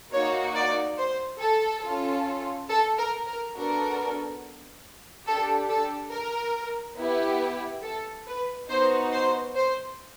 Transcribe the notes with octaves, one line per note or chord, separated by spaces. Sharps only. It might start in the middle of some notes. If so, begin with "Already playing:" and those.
A#3 D#4 F#4 C#5
D5
C5
A4
C#4 F4 A4
A4
A#4
A#4
B3 D4 F#4 A4 A#4
D4 G4 A4
A4
A#4
B3 E4 G4
A4
B4
B3 D#4 F#4 C5
C5
C5